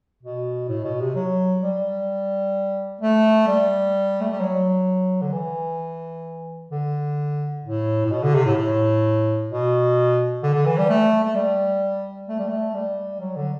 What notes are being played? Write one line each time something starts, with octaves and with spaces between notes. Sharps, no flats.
B2
A2
B2
C3
F#3
G3
A3
G3
A3
G3
F#3
D3
E3
D3
A2
A2
B2
D3
C3
A2
A2
B2
D3
D3
E3
G3
A3
A3
G3
A3
G3
A3
G3
F#3
D3